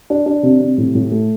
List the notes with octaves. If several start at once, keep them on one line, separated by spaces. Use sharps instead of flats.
D4
D4
C3
C3
A2
A2
A3